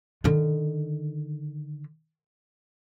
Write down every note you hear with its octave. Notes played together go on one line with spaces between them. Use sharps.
D3 D#3